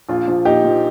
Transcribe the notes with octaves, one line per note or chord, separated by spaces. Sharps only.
A#1 F4
F3
A#2 D#4 G4
F3